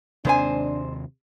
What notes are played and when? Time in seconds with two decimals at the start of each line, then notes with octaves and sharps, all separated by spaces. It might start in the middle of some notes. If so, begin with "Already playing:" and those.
0.25 D#2 G#2 C3 C4 D4 C5 G#5